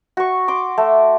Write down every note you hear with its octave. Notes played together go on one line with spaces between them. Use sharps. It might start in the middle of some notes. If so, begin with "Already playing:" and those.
F#4 C#6
C6 D6
A3